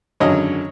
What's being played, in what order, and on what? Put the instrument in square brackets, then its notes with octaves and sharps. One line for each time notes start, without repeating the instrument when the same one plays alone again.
[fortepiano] G#1 F#2 D3 F#3 C#5 D#5